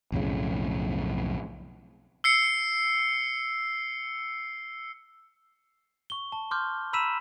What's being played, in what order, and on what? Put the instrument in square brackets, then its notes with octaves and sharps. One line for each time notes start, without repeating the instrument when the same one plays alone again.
[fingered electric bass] B1 F2 A2 C#3
[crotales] E6 C7 C#7
[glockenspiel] C#6 G7
A5
C6 D6 F6 G6
A#5 B5 E6 B6 D#7 E7